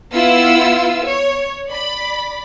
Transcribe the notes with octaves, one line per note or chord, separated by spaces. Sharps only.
B3 E4 F4 E6
C#5
D5 B5